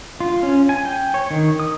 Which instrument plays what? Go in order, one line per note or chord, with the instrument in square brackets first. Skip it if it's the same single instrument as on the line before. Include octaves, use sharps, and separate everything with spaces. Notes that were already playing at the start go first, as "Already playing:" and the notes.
[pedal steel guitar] F4
C#4
G#5
G5
C#5
D#3
D#6